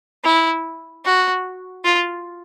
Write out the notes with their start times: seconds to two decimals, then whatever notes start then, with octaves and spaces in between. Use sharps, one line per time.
0.24 E4
1.05 F#4
1.85 F4